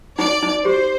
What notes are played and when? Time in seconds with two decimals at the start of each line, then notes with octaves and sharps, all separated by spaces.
0.19 D#4 D5
0.43 D#4
0.65 G4 C5